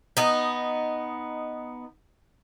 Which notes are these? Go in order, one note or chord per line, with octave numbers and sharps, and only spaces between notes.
B3 D#4